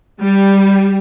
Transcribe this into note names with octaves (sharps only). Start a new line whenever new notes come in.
G3